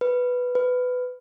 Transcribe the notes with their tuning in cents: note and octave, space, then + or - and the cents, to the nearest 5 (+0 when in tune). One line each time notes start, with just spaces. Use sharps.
B4 +0
B4 +15